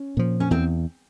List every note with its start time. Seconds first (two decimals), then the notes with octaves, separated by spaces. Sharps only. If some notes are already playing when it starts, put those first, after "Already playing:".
Already playing: C#4
0.17 A#2 F3
0.40 C#4
0.51 E2 C4